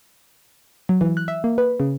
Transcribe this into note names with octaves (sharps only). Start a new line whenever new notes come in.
F#3
E3
F#6
E5
A#3
B4
C#3